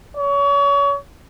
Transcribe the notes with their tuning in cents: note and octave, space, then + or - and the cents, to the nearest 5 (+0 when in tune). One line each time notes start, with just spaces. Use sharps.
C#5 +30